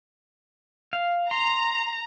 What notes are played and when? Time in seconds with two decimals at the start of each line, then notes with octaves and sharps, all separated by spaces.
0.93 F5
1.31 A#5 C6